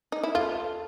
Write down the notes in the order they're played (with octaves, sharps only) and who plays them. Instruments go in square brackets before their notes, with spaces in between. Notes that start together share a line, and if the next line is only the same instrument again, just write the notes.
[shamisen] D#4
E4
[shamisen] F4 [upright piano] A4